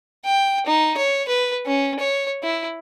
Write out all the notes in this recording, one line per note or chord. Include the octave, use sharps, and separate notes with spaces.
G5
D#4
C#5
B4
C#4
C#5
E4